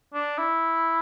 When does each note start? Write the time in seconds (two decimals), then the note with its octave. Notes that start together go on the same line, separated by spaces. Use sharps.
0.14 D4
0.38 E4